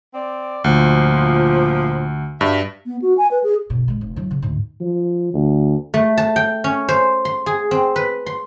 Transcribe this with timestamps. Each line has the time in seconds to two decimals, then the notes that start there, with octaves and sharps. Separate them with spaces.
0.14 C4 D5
0.64 D2 A#2 F3
2.41 G2 F#4 E5
2.86 B3
3.02 F#4
3.18 G#5
3.31 B4
3.44 G#4
3.70 G2 B2
3.88 A1 G#3
4.01 F1
4.16 F#3 E4
4.31 C#3
4.42 D2 G#2
4.81 F3
5.34 D2
5.94 A3
6.18 A5
6.36 G5
6.64 C#4
6.89 C5
7.25 C6
7.46 G#4
7.71 C4
7.96 B4
8.26 C6